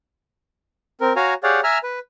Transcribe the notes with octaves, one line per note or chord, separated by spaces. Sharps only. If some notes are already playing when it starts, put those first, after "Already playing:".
C4 A#4
F#4 C#5 F5 G#5 A#5
G4 G#4 C#5 D5 F5 F#5
E5 G#5 A#5 E6 F6
B4